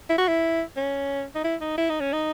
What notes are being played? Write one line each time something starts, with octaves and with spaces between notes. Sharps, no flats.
E4
F#4
E4
C#4
D#4
E4
D#4
E4
D#4
C#4
D#4